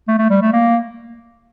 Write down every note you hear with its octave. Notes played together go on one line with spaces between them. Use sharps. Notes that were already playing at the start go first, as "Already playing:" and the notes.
A3
A3
G3
A3
A#3